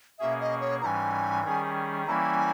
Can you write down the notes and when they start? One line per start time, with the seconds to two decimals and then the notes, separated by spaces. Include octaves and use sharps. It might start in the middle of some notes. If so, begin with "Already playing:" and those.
0.19 B2 A#3 C#4 G#4 E5
0.40 D#5
0.61 C#5
0.81 G#2 E3 G3 C#4 G#5 A#5
1.44 D#3 G3 C#4 G#4
2.07 E3 G3 A#3 C#4 E4 G#5 A#5